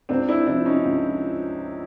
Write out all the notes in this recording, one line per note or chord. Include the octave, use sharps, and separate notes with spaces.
C#2 C4 D4
D4 E4
C3 F3 D4 E4
C#4 D#4
C#2